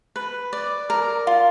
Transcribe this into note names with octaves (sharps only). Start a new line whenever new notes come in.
B4
D5
A#4
F4